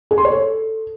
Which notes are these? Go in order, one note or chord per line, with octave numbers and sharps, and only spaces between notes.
G#4
C6
C#5
A4